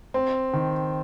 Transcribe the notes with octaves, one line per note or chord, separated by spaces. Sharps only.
C4
D#3